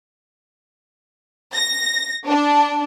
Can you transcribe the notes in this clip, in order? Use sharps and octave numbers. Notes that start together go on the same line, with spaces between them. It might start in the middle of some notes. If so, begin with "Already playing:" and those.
A#6
D4